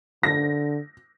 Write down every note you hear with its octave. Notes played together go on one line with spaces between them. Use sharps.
D3 A#6